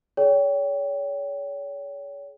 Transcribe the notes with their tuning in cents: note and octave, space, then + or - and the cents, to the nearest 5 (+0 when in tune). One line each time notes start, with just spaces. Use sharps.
G#4 +30 C#5 +35 G5 +0